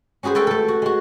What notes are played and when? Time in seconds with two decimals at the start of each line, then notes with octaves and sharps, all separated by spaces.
0.23 C#4 F#4 G#4 B4 C5
0.35 A3 F#4 A4 B4 G5
0.47 A3 A4
0.68 F#4
0.82 G#3 F#4